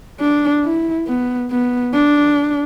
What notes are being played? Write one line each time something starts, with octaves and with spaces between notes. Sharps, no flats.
D4
E4
B3
B3
D4